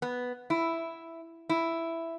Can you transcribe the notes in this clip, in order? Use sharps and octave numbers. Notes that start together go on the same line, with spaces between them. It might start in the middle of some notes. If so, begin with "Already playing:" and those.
B3
E4
E4